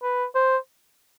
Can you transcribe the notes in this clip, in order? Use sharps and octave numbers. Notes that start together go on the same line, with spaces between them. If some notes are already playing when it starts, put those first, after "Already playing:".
B4
C5